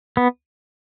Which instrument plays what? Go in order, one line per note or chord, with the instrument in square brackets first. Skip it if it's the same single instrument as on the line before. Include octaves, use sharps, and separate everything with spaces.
[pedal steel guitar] B3